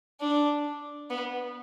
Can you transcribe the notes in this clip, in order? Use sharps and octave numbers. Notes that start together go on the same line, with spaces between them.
D4
B3